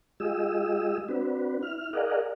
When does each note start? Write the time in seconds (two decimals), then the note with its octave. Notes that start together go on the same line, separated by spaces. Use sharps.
0.20 G#3 F4 G4 G#4 D#5 E6
1.09 C4 D4 F#4 B4
1.62 E4 F6
1.93 G#4 A#4 D5 D#5 F5 F#5